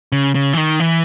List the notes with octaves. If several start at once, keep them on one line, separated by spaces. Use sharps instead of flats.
C#3
C#3
E3
D#3
E3